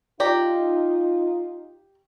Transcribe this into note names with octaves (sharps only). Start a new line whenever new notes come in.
D#4 F4 G4 D5 A#5